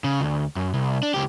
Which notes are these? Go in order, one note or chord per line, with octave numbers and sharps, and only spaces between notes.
C#3
D2
F#2
C2
D4
C#2 G4